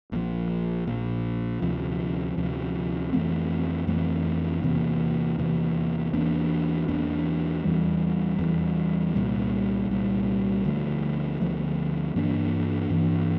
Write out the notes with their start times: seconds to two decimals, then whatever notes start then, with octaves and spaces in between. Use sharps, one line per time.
0.12 A#1 A#2 F3
0.87 A#1 A#2 F3
1.62 D2 C3 F3
2.37 D2 C3 F3
3.13 F2 E3 A3 C4
3.87 F2 E3 A3 C4
4.63 E2 C3 E3 A#3
5.38 E2 C3 E3 A#3
6.13 E2 E3 A#3 D4
6.88 E2 E3 A#3 D4
7.64 E2 E3 G3
8.39 E2 E3 G3
9.14 C2 A#2 G3
9.89 C2 A#2 G3
10.65 D2 D3 F3 A3
11.40 D2 D3 F3 A3
12.16 G2 E3 A#3 D4
12.90 G2 E3 A#3 D4